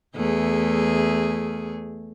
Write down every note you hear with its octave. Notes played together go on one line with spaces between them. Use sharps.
E2 A3 G#4